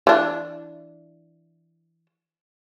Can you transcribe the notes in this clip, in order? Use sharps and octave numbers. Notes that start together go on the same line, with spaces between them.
E3 D4